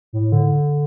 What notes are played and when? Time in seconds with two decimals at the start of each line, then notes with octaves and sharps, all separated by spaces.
0.13 A2
0.32 D3